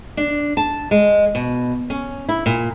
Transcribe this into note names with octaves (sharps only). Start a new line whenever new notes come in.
D4
A5
G#3
B2
C#4
E4
A#2